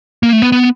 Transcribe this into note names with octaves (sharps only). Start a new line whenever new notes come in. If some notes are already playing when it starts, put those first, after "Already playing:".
A#3
A3
B3
B3